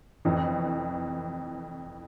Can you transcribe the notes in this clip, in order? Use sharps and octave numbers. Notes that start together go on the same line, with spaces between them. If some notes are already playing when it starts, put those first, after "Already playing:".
F1 F2 E3